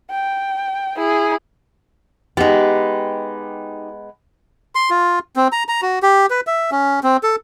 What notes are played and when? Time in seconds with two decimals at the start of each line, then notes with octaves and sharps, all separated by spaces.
0.11 G5
0.96 E4 G#4
2.37 G#3 B3 D#4 G4
4.75 C6
4.90 F4
5.36 C4
5.52 A#5
5.68 A#5
5.82 F#4
6.03 G4
6.30 B4
6.47 E5
6.71 C#4
7.04 C4
7.23 A4